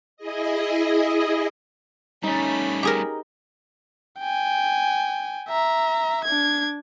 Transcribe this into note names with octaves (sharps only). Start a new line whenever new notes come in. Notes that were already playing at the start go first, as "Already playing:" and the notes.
E4 G#4 D#5
G3 A3 C#4 D#4 B5
G4 G#4 A#4
G5 G#5
E5 A#5
D4 G#6